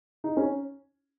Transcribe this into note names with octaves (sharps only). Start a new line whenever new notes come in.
D#4
C#4